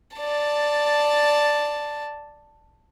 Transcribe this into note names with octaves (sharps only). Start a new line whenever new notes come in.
D5 A5